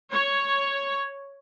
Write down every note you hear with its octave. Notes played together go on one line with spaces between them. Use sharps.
C#5